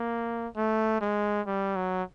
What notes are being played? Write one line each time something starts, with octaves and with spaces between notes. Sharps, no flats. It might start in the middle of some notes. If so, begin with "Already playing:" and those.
Already playing: A#3
A3
G#3
G3
F#3